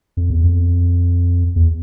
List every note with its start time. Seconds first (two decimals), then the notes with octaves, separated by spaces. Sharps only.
0.17 F2
0.30 E2
0.43 F2
1.56 E2